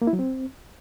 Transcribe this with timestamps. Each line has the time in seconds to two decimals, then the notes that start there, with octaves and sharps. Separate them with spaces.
0.02 A#3
0.07 E4
0.13 F#3
0.19 C4